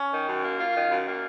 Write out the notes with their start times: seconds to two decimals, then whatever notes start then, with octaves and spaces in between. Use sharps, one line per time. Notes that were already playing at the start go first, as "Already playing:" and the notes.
Already playing: C#4
0.10 D#3
0.26 F#2
0.42 A#3
0.58 F4
0.75 D#3
0.90 F#2
1.06 A#3